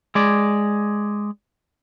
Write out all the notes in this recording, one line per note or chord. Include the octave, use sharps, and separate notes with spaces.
G#3 D5